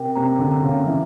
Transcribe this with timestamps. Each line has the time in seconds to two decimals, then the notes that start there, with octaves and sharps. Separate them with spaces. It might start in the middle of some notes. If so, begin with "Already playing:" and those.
Already playing: C3 A#4 G5
0.15 C3 A#5
0.39 D3
0.51 A#5
0.63 C#3
0.86 E3 E5